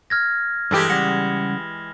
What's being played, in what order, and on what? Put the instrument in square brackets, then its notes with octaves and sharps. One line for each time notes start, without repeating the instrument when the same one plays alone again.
[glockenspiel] F6 G#6 A#6
[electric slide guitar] G2 A4 G5 [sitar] E3 G#3 G4
[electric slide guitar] C#3 G3 F#5 [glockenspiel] A#6